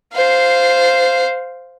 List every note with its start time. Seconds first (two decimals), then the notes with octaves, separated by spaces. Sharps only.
0.13 C5 F5